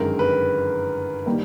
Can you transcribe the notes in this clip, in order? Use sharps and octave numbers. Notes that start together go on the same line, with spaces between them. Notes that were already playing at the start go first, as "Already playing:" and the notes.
Already playing: G1 F#2 D#3 G#3 A#4
B4
D#3 G3 A#3